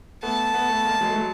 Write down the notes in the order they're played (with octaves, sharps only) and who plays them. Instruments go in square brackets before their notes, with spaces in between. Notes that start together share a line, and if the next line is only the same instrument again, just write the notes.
[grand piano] A3 B3 [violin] A5
[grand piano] A3 B3
A3 B3
G#3 A#3
F#3 G#3
A3
F#3 G#3